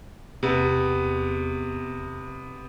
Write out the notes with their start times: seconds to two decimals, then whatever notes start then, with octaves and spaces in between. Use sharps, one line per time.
0.43 E2 C3 B3